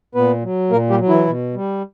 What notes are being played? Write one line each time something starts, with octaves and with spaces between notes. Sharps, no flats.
A#2 B3 B4
F#3
A#2 A#3 A#4
G3 G4
F#3
E3 E4
B2
G3